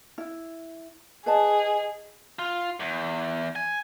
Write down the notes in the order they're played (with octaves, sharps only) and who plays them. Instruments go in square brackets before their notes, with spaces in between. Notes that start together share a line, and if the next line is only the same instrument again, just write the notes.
[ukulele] E4
[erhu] G#4 [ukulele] B4 D#5 A5
[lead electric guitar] F4
E2
G#5